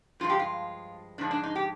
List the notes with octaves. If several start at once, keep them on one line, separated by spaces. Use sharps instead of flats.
G2 F3 G#3 F4
G4
F4
G#2 F3 G#3 D4
D4
D#4
G4